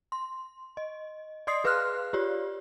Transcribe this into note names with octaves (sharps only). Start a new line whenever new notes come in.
C6
D#5
D5 D#5 C6 D#6 C7
G#4 B4 F5 C6 F6 F#6
F4 G4 C#5 D5